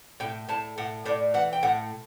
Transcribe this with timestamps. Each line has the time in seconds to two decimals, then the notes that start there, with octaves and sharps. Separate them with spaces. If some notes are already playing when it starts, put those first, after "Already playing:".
0.20 A2 G5
0.49 A2 A5
0.78 A2 F#5
1.06 A2 D5
1.34 E3 F#5
1.53 G5
1.63 A2 F#5